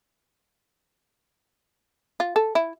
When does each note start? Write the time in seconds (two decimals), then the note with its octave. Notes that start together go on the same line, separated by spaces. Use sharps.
2.20 F4
2.36 A4
2.55 E4